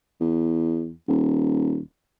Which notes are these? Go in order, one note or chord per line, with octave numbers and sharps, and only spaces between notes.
E2
D#1